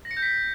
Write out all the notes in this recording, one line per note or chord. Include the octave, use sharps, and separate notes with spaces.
A#6
C#7
G6
B6